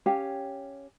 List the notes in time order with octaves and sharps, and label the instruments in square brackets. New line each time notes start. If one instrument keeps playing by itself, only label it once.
[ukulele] C#4 G4 C#5 F5